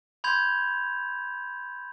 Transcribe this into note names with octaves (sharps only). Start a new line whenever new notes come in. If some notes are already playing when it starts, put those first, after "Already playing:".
B5 C6 G6 G#6 F7